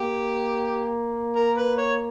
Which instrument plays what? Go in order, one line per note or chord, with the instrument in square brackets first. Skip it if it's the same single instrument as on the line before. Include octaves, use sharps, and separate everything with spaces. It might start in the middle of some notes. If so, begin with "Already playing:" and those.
Already playing: [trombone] A#3 [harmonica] G4
[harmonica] A#4
B4
C#5